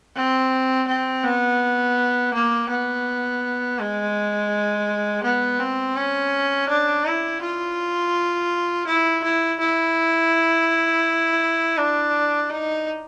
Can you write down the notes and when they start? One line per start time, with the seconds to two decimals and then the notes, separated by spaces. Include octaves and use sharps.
0.16 C4
0.88 C4
1.24 B3
2.34 A#3
2.69 B3
3.79 G#3
5.23 B3
5.60 C4
5.96 C#4
6.69 D4
7.06 E4
7.41 F4
8.87 E4
9.24 E4
9.60 E4
11.78 D4
12.50 D#4